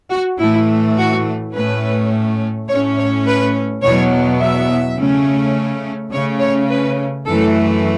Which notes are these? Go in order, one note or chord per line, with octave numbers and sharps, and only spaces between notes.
F#4
A2 E3 A3 E4
F#4
A2 A3 C#4 B4
A2 A3 C#4 C#5
C#5
B4
E2 B2 F#3 B3 C#5
E5
C#3 A3 C#4
C#3 A3 C#4 C#5
C#5
B4
F#2 E3 A3 A4